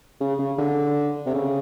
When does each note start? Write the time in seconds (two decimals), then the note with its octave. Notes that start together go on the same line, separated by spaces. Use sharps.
0.21 C#3
0.39 C#3
0.58 D3
1.26 C3
1.35 C#3